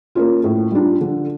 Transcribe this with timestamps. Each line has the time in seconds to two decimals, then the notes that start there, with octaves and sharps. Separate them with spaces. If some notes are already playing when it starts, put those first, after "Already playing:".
0.15 A#3 C#4 F4
0.44 A2
0.72 G3 D4 F4
1.01 D3